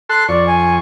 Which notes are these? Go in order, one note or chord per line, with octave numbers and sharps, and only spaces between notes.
A4 C6 F#6
F2 D5 C#6
G#5